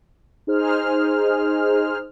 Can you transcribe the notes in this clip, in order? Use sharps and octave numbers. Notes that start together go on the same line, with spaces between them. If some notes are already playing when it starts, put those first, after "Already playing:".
D#4 G#4 C5 F6